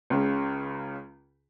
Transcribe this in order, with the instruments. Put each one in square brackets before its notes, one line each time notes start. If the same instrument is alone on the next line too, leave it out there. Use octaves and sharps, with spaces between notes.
[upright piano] C#2 C#3